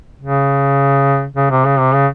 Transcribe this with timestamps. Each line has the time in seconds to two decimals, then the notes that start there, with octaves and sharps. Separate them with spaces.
0.22 C#3
1.36 C#3
1.51 C3
1.65 C#3
1.79 C3
1.95 C#3